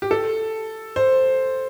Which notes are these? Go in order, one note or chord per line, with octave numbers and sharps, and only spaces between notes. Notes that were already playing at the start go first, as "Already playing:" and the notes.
G4
A4
C5